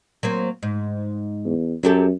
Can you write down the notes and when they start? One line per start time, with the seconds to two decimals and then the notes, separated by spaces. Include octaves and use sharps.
0.23 F#3 A#3 C4
0.63 G#2
1.45 E2
1.83 F#2 F#3 G4 A4